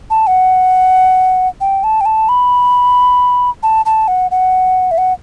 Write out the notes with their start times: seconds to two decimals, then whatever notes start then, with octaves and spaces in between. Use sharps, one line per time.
0.10 A5
0.27 F#5
1.61 G5
1.84 A5
2.01 G5
2.06 A5
2.29 B5
3.63 A5
3.86 A5
4.08 F#5
4.31 F#5
4.91 E5
4.98 F#5